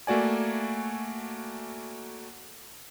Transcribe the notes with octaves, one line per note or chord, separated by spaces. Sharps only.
A3 A#3 F#4 D5 G#5